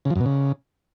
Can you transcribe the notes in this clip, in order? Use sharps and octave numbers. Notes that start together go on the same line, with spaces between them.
C#3
F3
F#2
B2
C#3